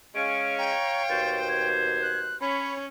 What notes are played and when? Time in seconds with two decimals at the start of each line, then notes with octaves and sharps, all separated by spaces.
0.15 G#3 C#4 C#5 F5 D7
0.58 G5 A#5
1.09 D#2 B2 C5 A6
1.48 G#6
2.02 F#6
2.41 C#4 C#5 B5